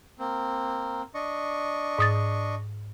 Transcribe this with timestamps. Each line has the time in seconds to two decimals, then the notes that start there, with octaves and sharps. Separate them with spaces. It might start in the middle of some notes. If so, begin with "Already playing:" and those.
0.19 A#3 C4
1.15 D4 D#5 C#6
1.98 G#2 D#6 A6